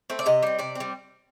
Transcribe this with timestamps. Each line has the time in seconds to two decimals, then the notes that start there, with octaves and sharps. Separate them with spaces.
0.10 A3 C4
0.19 D5
0.26 C3 D#5
0.43 G3 C4
0.59 C3 D5
0.75 G3 C4